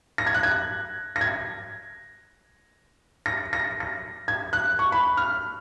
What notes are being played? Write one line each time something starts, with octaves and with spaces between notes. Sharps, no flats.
A#6
G#6
F#6
G#6
A#6
G#6
A#6
A#6
A#6
G#6
F#6
C#6
B5
F6